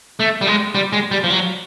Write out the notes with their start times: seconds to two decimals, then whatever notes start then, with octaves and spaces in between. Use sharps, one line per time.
0.20 A3
0.41 G3
0.47 G#3
0.75 G3
0.93 G#3
1.11 G3
1.24 F3
1.30 F#3